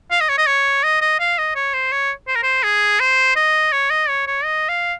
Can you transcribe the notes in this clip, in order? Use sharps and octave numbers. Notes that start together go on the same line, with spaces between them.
F5
D#5
C#5
D#5
C#5
D#5
D#5
F5
D#5
C#5
C5
C#5
C5
A#4
C5
G#4
C5
D#5
C#5
D#5
C#5
C#5
D#5
F5